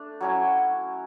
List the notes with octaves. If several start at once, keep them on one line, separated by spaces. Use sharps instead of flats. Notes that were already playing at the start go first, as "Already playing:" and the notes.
Already playing: A3 D4
F#3 C#4 E4